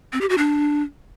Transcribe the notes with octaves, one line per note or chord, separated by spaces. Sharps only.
C4
G4
F#4
D4